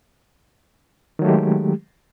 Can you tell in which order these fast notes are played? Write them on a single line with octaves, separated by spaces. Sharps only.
D#3 F#3 A3 G4 G#3